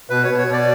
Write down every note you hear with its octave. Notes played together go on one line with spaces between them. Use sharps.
B2 B4
B2 C#5
C#5
B2
D5